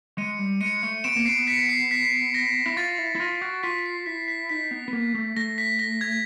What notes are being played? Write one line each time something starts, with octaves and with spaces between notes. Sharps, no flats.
G#3 C#7 D#7
G3
G#3 C#7 D#7
A3
B3 D7 E7
A#3
B3 C7 D7
B6 C#7
C7
B6
A#6
E4
F4 A6
E4
E4
F4 A#6
F#4
F4 B6
C7
E4 B6
B6
D#4 B6
B3
B3
A#3
A3
A3 A#6
B6
A#6
G#6